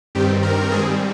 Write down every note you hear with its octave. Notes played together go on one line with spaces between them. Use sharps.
G2 D#3 G3 C4 G4
A#4
G#2 G3 C4 G#4